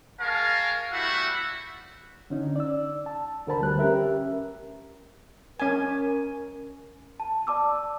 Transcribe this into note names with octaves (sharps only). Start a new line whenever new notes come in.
G#3 A#4 C#5 F5 A5
G3 A3 E4 F#4 E5 F#5
D3 C#4 D#4
D5 E6
A5
D2 D3 A#4 C5 A5 B5
D2 G3 B4 F#6
C#4 G4 A#4 E5
C#4 A#4 G#5
A5
D5 A5 D6 E6